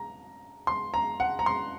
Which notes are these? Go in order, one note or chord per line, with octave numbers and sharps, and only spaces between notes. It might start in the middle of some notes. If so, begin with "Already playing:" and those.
Already playing: A#5
C6
A#5
F#5
A#5
C6